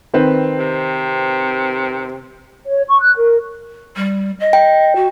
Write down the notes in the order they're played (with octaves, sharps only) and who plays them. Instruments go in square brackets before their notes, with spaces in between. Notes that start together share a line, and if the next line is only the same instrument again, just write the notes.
[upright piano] D#3 C4 B4
[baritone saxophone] C3
[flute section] C#5
C#6
F#6
A#4
[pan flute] G3
D#5
[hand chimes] G5
[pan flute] F#4